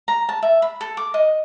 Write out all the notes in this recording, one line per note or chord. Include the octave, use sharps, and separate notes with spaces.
A#5
A5
E5
B5
A4
D6
D#5